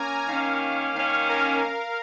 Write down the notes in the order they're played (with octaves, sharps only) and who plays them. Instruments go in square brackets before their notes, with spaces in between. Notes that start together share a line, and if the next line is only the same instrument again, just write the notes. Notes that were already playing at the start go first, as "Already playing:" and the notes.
Already playing: [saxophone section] A#3 C#4 [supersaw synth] G#5 A#5
[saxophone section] D#3 A#3 C#4 [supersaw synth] F5
[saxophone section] D#3 A#3 C#4 [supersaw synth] F5
[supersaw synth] A#4